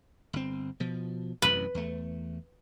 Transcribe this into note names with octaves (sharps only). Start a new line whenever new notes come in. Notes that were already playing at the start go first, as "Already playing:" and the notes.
G1 C4
B2 F3
A1 F#2 C3 B4
E2 A3